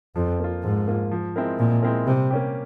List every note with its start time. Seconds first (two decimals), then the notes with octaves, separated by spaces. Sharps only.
0.16 F2 F3
0.40 A#3 F4
0.63 G#2 F3
0.88 A#3 F4
1.12 F3
1.36 G#3 C4 E4 A#4
1.59 A#2 F3
1.83 G#3 C4 E4 A#4
2.06 C3 G3
2.31 A#3 C#4 G4